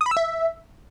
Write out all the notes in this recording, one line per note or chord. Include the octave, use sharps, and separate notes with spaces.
D#6
B5
E6
E5